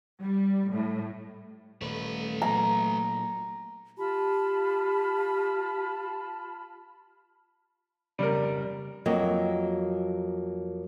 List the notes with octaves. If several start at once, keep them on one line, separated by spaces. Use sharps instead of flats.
G3
A2
D#1 A3 B4
A#2 F#3 A#3 A#5
F4 G4 A5 B5
F2 C#3 G3 A#4 D5
F2 F#3 A#3 F#4 A#4 D#5